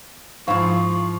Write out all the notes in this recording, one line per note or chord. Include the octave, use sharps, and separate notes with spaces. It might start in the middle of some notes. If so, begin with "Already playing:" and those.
G#2 F3 E4 F5 C#6